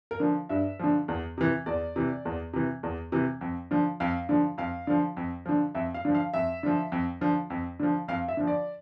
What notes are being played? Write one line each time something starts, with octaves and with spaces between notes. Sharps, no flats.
A#4
D3 F3
G2 E5
D3 F3
E2
C3 E3
E2 D5
C3 E3
E2
C3 E3
E2
C3 E3
F2
D3 F3
F2 F5
D3 F3
F2 F5
D3 F3
F2
D3 F3
F2 E5
F5
D3 F3
F5
F2 E5
D3 F3
F2
D3 F3
F2
D3 F3
F2 F5
E5
D3 F3
D5